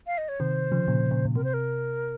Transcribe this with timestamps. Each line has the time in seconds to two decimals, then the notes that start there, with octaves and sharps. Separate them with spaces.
0.07 F5
0.18 D#5
0.29 C#5
0.40 C3 D#3 C5
0.72 C#3 F3
0.88 A#2 C#3
1.11 A#2 C#3
1.25 A#2
1.35 C3 A#4
1.44 C5
1.54 A#4